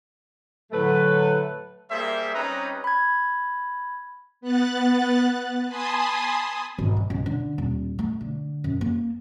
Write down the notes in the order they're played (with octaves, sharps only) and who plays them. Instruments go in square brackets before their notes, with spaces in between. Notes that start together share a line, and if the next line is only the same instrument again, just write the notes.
[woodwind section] A2 D3 F#3 [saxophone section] A3 B4
[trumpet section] G3 A#3 G#4 C5 E5
G3 C4 C#4 D#4 B4 A#5
[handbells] B5 G#6
[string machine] B3 F#6 A6
G#5 A5 B5 C6 D#6
[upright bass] G#1
G#2
C#2
D3
D#1
A3
D3
F#2
A#3